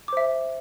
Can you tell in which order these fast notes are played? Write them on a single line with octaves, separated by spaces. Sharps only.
D6 C5 E5